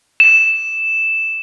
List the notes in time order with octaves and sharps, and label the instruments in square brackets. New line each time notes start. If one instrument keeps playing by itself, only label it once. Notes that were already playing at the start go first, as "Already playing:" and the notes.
[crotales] E7